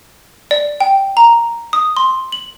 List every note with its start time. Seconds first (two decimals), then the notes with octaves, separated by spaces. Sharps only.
0.51 D5
0.80 G5
1.17 A#5
1.73 D#6
1.97 C6
2.32 F#7